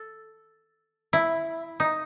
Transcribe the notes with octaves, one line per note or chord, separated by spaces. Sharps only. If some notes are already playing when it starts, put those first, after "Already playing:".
Already playing: A4
E4
D#4